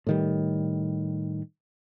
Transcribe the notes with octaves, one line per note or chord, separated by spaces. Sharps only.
A2 D#3 G3